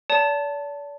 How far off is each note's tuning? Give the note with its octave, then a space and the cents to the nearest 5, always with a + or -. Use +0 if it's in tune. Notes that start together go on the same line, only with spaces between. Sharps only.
D5 -40 A5 +10